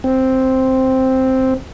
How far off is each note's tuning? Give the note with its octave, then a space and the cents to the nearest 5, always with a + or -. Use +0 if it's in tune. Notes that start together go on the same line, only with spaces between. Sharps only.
C4 +0